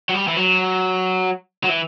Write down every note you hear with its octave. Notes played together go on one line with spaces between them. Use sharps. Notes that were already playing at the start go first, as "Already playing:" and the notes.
F#3
G3
E3
F#3
F#3
E3